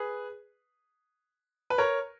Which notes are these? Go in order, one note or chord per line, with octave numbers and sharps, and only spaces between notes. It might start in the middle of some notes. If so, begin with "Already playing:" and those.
Already playing: G#4 B4
B4
A#4 C#5